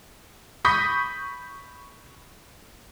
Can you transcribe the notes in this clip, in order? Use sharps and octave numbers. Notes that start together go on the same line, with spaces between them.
B5 C#6 D#6 G6 A#6 B6